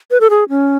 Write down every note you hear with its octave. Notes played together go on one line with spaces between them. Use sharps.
B4
A4
G#4
C#4